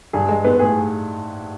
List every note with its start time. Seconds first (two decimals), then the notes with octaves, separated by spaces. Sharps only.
0.13 G2 G#4
0.29 G#3
0.44 G#2 B3
0.59 A2 G#4